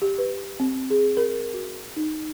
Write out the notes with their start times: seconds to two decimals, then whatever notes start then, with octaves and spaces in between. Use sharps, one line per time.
0.02 G4
0.18 B4
0.60 C4
0.90 G#4
1.17 A#4
1.54 F#4
1.96 D#4